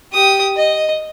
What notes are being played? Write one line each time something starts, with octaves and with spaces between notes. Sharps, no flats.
G4 D#6
D#5